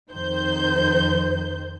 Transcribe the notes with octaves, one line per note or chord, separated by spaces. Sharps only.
F2 D#3 C5 G6